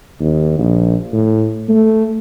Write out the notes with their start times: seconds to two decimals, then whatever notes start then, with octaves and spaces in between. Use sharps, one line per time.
0.20 D#2
0.59 A#1
1.13 A2
1.68 A3